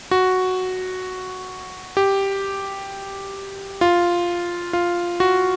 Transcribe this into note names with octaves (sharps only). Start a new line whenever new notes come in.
F#4
G4
F4
F4
F#4